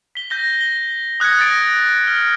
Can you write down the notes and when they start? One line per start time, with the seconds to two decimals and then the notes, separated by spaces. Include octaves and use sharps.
0.15 B6 G7
0.30 G6 A#6 G7
0.61 G7
1.20 D#6 F#6 G#6 A#6 C#7
1.39 A6 A#6 D7
2.07 F6